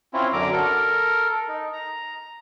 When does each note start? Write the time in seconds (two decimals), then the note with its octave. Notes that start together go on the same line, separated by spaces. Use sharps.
0.14 C4 C#4 E4 F4
0.33 F#2 D3 F#3 A#5 D6
0.52 A4 A#4
1.48 D#4
1.73 A#5